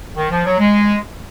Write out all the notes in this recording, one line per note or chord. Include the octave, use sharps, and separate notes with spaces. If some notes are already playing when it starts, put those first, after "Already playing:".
D#3
F3
F#3
G#3